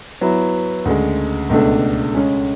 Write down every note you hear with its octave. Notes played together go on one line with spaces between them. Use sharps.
F#3 B3 E4
D2 C#3 G#3
C#2 B2 A3 D4 A4
C#3 G#3 C#4